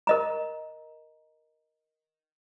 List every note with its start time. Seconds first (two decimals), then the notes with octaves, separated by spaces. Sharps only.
0.07 A#4 D#5 A#5